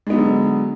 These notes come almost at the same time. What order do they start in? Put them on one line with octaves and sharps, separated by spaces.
G#3 B3 F#3 D3